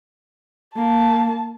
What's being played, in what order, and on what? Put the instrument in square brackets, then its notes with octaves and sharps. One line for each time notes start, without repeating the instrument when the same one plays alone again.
[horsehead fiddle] A#3 [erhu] A5